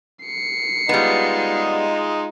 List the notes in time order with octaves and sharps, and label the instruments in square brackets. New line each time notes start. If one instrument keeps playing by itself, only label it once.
[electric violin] C7 C#7
[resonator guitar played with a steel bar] G3 B3 [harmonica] G#3 D#4 F4